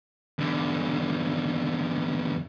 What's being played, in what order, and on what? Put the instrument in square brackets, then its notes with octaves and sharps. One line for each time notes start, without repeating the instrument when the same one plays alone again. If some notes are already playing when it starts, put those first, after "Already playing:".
[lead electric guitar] E2 D3